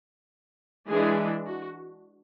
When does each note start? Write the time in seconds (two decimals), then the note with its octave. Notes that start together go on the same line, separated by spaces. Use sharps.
0.91 E3 G#3 D4 G#4
1.47 F#4